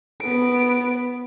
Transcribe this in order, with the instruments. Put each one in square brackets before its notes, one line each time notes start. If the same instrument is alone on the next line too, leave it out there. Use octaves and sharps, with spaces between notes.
[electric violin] B3 D7